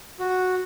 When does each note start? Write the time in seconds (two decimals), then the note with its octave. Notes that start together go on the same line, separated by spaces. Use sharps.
0.19 F#4